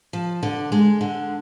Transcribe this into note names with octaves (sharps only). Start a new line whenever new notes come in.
F3
D3
G#3
D3